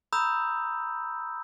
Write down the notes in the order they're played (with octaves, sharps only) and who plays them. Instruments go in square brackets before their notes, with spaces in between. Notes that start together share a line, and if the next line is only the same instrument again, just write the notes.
[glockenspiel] A#5 B5 D#6 E6 G6